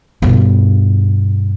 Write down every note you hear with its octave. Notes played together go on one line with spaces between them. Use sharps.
G2 B2